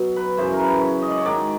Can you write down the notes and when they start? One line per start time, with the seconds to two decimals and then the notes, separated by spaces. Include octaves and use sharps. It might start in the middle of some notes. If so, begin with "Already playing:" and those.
Already playing: B2 F#3
0.16 B4
0.37 F#2 C#3 E3 C5
0.53 A#4
0.59 B4
0.81 C#5
1.02 D#5
1.10 D5
1.18 C#5
1.25 G#2 D#3 F#3 D5